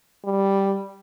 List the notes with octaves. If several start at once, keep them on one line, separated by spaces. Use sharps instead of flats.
G3